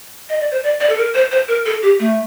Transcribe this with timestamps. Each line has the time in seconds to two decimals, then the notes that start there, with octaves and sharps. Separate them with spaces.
0.29 D#5
0.40 D5
0.51 C5
0.63 D5
0.80 D5
0.89 A4
0.98 A#4
1.14 C5
1.31 C5
1.48 A#4
1.66 A4
1.82 G4
1.99 A3